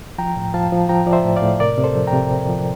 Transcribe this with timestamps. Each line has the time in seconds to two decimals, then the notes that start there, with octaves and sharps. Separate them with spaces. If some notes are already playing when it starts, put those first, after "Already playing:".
0.18 F3 G5 A#5
0.36 A2
0.54 F3 F5 A5
0.72 F3
0.89 F3 G5 A#5
1.07 F3 D5
1.13 C5 E5
1.24 A2
1.36 D5 F5
1.42 A2
1.60 C3 A#4 D5
1.78 C3
1.84 A4 C5
1.95 F3
2.07 G5 A#5
2.13 C3
2.31 C3
2.48 F3